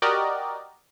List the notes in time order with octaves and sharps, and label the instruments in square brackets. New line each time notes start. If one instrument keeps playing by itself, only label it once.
[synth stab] F#4 G4 A#4 D5 D#5